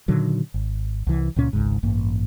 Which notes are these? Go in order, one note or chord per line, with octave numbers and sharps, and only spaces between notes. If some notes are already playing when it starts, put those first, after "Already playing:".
A#2 D3 D#3 F#3
G#1
C2 E3
C#2 A#2 C#4
G#1 C#2 G#2
A1 G2 A#3